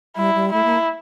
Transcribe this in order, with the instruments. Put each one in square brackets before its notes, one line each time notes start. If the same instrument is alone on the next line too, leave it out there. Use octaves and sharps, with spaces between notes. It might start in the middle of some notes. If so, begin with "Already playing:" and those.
[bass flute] G3 [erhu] E4
[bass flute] G3
[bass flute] A3 [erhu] E4
[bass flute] A#3